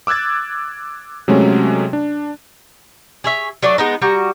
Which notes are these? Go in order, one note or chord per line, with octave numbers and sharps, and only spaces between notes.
D6 E6 F#6 G#6 A6
C3 F#3 G#3 A3 C#4
D4
G#4 C#5 E5
F#3 A3 D4 D5
G#3 B3 D#4
G3 F#4 A#5